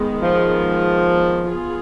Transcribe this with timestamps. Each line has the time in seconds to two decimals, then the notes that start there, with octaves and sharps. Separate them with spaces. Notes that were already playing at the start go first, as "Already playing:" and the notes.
Already playing: D#3 G#3 B3
0.22 F3
1.47 B3 F4 G#4